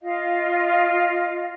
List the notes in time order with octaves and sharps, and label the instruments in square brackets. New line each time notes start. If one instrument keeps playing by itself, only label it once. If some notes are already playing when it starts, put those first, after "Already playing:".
[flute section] F4 D#5 F5